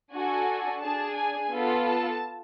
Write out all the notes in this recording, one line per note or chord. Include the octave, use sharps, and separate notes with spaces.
D4 F#4 A4 G#5
D4 G#4 A5
G#5
B3 F4 A4
A5